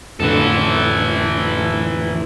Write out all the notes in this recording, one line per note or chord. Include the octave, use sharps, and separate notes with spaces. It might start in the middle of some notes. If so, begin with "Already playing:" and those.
F2 A2 D3 E3 A4